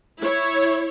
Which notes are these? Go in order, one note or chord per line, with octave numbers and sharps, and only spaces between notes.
E4 C#5